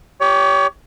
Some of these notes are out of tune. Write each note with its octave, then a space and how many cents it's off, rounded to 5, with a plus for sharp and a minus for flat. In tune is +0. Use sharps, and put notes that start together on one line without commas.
G4 +0 C#5 +30